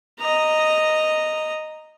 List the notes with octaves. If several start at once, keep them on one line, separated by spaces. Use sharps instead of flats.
D#5 A#5